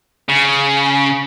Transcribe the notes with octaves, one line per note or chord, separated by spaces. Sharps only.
C#3